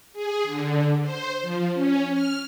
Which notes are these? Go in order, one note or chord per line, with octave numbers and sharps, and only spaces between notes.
G#4
D3
C5
F3
C#4
F6